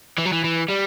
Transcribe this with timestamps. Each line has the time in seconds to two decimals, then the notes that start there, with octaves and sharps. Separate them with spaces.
0.18 E3
0.26 F#3
0.33 E3
0.45 E3
0.70 G3